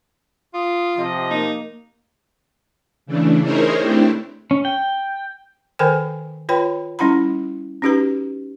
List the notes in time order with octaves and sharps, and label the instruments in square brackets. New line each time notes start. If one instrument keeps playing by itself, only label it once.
[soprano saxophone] F4 [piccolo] D#6
[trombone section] C3 F3 [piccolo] D#5
[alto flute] A#3 [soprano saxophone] D#4
[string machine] C#3 E3 A3 D4
D#4 E4 G#4 A#4 C5 C#5
A3 C4 D4 E4 G4
[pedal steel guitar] C#4
G5
[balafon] D#3 A4 A#4 C5 G5 G#5
F4 B4 C#5 G5 B5
G3 C#4 E4 F#5 A#5 B5
C#4 D#4 F#4 G4 B4 A#5